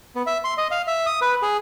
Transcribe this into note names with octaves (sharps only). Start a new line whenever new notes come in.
B3
E5
C6
D#5
F5
E5
D#6
B4
G#4